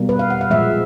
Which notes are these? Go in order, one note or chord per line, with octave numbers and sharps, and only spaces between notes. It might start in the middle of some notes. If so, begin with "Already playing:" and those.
Already playing: B2 G3 A#3
B4
F5
F#5
F5
A#2 F3 G#3 E5